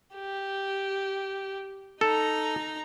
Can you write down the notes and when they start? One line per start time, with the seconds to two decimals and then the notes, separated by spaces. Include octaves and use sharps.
0.15 G4
2.01 D#4 A4 A#5